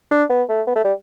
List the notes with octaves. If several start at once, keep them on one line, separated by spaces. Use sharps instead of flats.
D4
B3
A3
B3
A3
G3